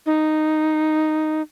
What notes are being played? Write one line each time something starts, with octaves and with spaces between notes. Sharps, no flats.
D#4